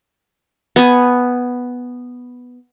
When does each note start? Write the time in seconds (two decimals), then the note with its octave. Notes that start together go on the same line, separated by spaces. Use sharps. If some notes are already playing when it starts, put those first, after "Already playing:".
0.76 B3 G#5